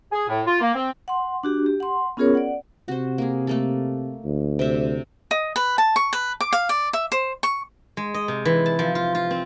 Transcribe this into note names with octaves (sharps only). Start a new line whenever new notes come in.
G#4
A2
F4
A#3
C4
F#5 C6
D4 F#4 G4
G4
F#5 C6
B3 C#4 F4 G#4 A#4 C#5
D5 F#5
C3 F#4 C5
A#3 G#4
A3 A#3 A4
D2
C3 E5
D#5
B4
A5
C#6
B4
D6
F5
D5
E5
C5
C#6
G#3
D#5
C3
E3
A5
F3
F4
F4
C4